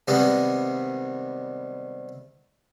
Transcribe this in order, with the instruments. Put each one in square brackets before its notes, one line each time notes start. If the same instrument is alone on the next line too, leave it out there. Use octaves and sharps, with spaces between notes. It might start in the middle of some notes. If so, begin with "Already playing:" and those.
[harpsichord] C3 D#3 G3 G#3 B3